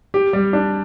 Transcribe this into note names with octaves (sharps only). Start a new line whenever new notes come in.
G4
G3
D4